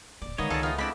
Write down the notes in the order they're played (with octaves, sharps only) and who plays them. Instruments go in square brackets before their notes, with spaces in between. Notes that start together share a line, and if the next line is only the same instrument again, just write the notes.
[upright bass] D#1 A#3 [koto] D5
[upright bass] D3 G#3 [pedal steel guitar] D#3 C#5 [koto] A#3 B3 D#5
[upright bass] C#2 [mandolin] D4 A4 [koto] F4 G#4 F5
[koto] A3 B3 [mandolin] F4
[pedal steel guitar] G#3 C4 E4 [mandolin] D4 D5 B5